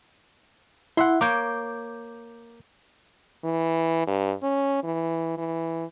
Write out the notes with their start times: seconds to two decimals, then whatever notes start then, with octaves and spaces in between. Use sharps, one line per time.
0.97 E4 E5 F#5 C6
1.21 A#3 C#5 D6 G6
3.44 E3
4.07 G2
4.43 C#4
4.84 E3
5.38 E3